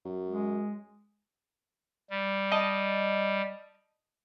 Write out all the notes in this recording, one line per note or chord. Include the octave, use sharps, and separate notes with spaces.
F#2
G#3
G3
D#5 A5